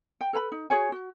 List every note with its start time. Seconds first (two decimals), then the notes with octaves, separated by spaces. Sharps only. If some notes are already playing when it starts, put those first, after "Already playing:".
0.21 G5
0.33 A4 B4 A#5 B5
0.52 D#4
0.70 F#4 G#4 C#5 G#5
0.92 F#4